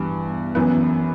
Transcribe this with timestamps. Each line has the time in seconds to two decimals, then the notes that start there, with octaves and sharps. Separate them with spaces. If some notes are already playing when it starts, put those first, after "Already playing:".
Already playing: G2 E3 B3
0.55 F#2 E3 B3